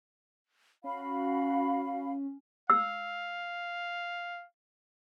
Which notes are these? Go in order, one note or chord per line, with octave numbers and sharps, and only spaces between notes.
C#4 F#4 F5 B5
F5 E6